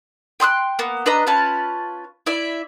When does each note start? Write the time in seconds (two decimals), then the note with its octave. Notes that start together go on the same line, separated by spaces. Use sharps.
0.40 G5 C6 D#6 F#6
0.79 A#3 B3
1.06 D4 B4 D#5 A#5
1.27 C#4 F4 B4 A5
2.26 E4 D5 E5